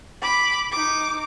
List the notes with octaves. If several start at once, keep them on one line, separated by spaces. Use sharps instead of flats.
B5 D6
D#4 D6